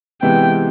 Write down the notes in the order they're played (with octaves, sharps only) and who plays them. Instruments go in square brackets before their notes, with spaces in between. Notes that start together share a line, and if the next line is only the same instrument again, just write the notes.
[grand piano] C3 E3 G#3 B3 [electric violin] G5